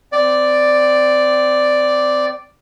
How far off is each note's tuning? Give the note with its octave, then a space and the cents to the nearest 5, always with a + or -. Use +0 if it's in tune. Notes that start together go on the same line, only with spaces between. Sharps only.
C4 -20 D5 +0